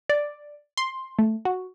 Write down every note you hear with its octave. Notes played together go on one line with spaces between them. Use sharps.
D5
C6
A3
F#4